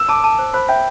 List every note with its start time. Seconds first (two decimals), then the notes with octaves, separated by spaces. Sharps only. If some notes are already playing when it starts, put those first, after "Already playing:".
Already playing: E6
0.08 A5 D6
0.24 A5
0.39 C5
0.54 C5 B5
0.68 E5 G5